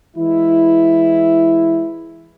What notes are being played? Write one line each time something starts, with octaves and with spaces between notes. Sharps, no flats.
E3 G#3 E4